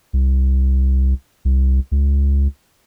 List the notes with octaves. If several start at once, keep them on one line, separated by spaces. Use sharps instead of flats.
C2
C2
C#2